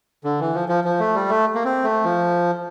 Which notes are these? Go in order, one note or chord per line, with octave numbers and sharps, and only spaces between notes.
D3
E3
F3
F3
F3
A3
G3
A3
A#3
C4
A3
F3